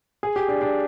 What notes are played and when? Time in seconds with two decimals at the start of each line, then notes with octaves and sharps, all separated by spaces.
0.23 G#4
0.36 G4
0.48 D4
0.62 D4